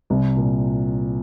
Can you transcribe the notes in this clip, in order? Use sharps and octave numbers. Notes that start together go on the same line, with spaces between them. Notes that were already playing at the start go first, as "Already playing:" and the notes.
C2 C3
A#2